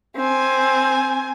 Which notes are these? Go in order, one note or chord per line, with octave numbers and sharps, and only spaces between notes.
C4 G#5